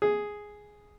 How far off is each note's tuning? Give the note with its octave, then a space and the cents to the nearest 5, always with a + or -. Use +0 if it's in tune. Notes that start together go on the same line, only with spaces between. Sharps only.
G#4 +0